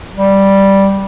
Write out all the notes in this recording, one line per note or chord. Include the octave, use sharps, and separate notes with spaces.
G3